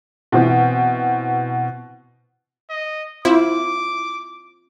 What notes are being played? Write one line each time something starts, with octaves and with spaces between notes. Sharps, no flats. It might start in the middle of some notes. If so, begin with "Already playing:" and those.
B2 E3 C4
D#5
C4 E4 F4 C5 D6